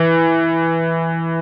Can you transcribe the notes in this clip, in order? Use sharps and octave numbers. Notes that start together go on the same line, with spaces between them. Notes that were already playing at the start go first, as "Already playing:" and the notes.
Already playing: E3